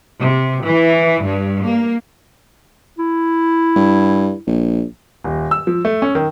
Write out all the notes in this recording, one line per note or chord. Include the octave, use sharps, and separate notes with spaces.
C3
E3
G2
A#3
E4
G2
A#1
D#1
E6
F3
A3
C#4
D#3